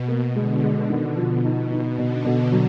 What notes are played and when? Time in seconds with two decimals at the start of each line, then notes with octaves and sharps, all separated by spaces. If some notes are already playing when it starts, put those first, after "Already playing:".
Already playing: B2
0.08 A#3
0.35 D3 G#3
0.63 G#3
0.90 D#3
1.17 B2 F3
1.44 D#4
1.71 D#4
1.98 B2 D3
2.25 B2
2.52 F#3